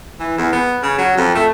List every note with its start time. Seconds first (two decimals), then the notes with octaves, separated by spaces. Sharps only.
0.20 E3
0.38 E2
0.53 B3
0.83 C#3
0.98 F#3
1.17 F2
1.35 A3